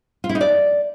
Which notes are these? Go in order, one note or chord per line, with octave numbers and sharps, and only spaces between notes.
F4
E4
D#4
D5